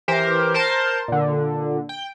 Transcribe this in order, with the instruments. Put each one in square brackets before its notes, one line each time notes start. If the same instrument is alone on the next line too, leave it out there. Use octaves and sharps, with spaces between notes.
[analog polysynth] E3 G4 A#4 C5
A#4 C5 A5 C6
A#2 D3
G5